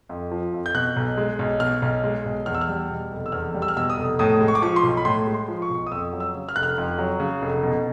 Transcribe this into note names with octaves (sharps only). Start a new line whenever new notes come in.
F2
F3
F2
G6
B2 F#6
B1
G#3
B1
B2 F6
B1
G#3
B1
E2 F6
E6
F6
G3
B2
F1
E6
E2 F6
G3
E6
F6
B2 E6
D#6
F1
A2 D#6
G#3
C#6
D6
F3 C#6
C6
B1
B5
A2 C6
G#3
C6
F3
C#6
B1
D#6
F2 E6
F#3
E6
C#3
F6
F1 F#6
F6
F2
F#3
C#3
F1
B2